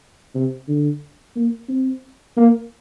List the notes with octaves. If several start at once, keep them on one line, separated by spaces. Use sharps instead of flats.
C3
D3
A#3
C4
A#3